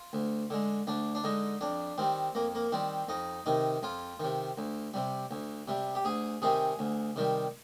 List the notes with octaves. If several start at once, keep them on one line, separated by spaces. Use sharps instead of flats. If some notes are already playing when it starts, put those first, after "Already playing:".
Already playing: F4
D2
D3 G#3
D2 D4
D4
D3 G#3 D#4
F2 D4
D#3 G3 C4
F2 A#3
A#3
D#3 G3 C4
F2 D#4
C3 D#3 D#4
F2 F4
C3 D#3
D2
C3 G3
D2
C3 G3
G4
D2 G#4
C3 D#3 G3 G#4
D2
C3 D#3 G3